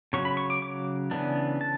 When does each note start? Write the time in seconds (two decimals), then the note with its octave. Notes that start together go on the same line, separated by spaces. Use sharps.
0.13 C#3 F#3 C#4 C#6
0.25 B5
0.37 C#6
0.50 D6
0.62 D6
1.11 C#3 E3 B3 D4
1.61 A5